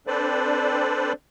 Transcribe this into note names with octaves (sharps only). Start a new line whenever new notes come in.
C4 D4 A4 B4 C5 D5